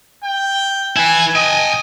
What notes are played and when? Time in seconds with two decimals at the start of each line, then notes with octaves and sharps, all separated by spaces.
0.24 G5
0.96 E4 B4 G#5
1.36 D#5 G5 G#5